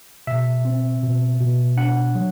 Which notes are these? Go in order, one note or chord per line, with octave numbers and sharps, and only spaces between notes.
B2 E5
C4
B2
B2
D4 F#5
F#3